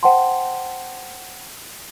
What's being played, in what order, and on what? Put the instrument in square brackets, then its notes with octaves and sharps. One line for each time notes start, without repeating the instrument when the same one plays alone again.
[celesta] C5 F#5 G5 A5 C6